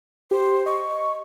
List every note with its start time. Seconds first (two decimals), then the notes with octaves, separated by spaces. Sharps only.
0.31 G4 C5
0.66 D#5 C#6